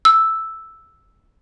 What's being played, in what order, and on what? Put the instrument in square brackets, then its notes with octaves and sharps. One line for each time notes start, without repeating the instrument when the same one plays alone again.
[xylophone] E6